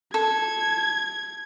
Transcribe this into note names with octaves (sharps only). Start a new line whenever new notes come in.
A4 G#6